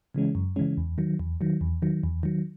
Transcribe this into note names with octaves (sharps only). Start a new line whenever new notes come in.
C#3 E3 G#3 C#4
F#2
C#3 E3 G#3 C#4
E2
D#3 F#3
E2
D#3 F#3
E2
D#3 F#3
E2
D#3 F#3